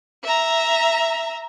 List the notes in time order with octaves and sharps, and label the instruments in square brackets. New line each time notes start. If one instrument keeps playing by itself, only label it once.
[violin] E5 A#5